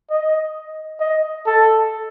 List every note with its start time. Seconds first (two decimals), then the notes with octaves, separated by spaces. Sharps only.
0.10 D#5
1.00 D#5
1.47 A4